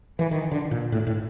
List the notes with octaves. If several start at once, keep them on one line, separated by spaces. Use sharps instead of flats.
E3
D#3
D3
A#2
A2
A2